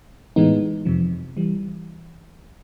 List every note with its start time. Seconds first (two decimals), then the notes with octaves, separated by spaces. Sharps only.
0.36 A2 E3 G#3 B3 D#4
0.85 F2 C3 F3
1.37 E3 G3